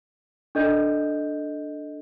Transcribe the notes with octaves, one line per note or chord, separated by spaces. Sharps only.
D4 A4 D#5 G6